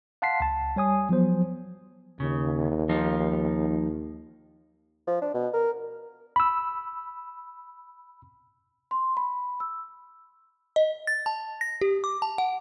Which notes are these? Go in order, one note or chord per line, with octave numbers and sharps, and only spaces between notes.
F5 F#5 A5 C6 B6 C7
C#2 A5
G3 C#5 G#5 D#6
F3 F#3 B3 C5
D#2 C#3
F3 D#4 F4
F3
D4
B2
A#4
B5 E6
C6
B5
E6
D#5
A6
A5
A#6
G4
D6
A5
F#5